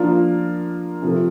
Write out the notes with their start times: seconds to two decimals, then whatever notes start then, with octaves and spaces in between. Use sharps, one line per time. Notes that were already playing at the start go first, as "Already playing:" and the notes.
Already playing: F3 A#3 D4 F4 A#4
1.02 C3 F3 A3